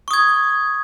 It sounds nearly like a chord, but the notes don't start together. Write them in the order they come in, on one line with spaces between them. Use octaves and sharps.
C#6 D#6 G#6